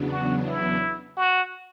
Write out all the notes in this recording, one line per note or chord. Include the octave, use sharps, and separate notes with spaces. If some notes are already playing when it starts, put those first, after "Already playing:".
Already playing: E2 C#3 F#3 B3 D4
F#4
E4
F#4